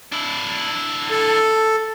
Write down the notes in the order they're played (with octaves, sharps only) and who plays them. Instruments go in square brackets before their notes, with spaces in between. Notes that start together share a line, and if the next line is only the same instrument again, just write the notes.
[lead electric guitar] D4 E4
[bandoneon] A4